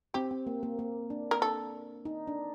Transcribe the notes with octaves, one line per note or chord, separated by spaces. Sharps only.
C4 G4
C4
A#3
A#3
A#3
D4
A#4
A4
D#4
D4